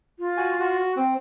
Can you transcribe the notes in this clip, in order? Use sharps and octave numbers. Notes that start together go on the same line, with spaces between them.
F4
F#4 G#5
F#4
C4